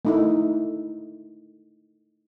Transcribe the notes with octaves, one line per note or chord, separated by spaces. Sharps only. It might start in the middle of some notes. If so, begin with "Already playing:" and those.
A3 D#4 E4